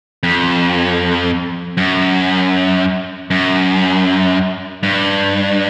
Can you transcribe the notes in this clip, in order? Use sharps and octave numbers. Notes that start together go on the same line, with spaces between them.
F2
F#2
F#2
G2